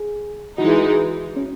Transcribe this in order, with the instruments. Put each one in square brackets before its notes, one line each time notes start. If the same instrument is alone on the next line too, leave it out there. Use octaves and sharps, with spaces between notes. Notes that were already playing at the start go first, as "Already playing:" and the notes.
Already playing: [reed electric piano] G#4
[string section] E3 G#3 D#4 [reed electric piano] F#4
[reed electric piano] E4
F#4
C#4